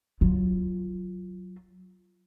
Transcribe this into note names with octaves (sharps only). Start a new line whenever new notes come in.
F#3 F4